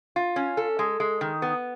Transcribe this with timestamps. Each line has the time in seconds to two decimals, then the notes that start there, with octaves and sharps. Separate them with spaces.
0.16 F4
0.36 C#4
0.57 A4
0.79 G#3
1.00 G#3
1.21 D#3
1.42 B3